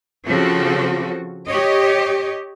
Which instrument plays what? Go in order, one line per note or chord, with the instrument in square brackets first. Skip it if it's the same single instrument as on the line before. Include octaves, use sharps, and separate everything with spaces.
[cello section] C#3 F3 C4 F#4 A4
G4 C#5 D#5